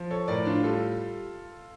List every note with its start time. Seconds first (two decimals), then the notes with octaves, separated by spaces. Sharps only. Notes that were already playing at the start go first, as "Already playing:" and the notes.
Already playing: F3
0.11 A4 C#5
0.28 A2 A#4 D5
0.45 D4 F4
0.63 G3 F4 A4